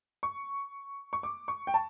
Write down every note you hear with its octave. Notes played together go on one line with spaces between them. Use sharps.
C#6
C#6
D6
C#6
G5
A5